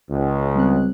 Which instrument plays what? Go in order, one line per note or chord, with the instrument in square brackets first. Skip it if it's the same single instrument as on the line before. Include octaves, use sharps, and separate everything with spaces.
[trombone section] C#2
[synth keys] G3 C4 F#6